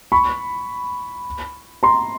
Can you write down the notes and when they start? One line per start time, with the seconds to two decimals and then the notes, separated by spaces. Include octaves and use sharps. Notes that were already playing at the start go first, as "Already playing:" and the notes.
0.12 B5 C#6
1.83 A#5 C6